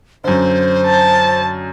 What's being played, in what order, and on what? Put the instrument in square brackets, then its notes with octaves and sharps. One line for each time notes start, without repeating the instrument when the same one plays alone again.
[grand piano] F#2 D3 [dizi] C5
[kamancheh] A5